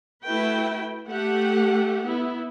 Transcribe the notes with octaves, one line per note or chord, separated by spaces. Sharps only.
A3 E4 F#4 B4 G5
A3 G4 F#5
B3 E4